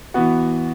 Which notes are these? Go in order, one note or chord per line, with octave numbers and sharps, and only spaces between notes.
E3 B3 F#4